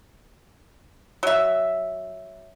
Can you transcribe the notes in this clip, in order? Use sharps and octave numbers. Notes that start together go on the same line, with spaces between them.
F#3 E5